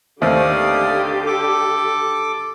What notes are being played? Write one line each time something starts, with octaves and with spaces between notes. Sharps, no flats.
D#2 D3 A3 C4 G4 D5 F5 D#6
A4 D6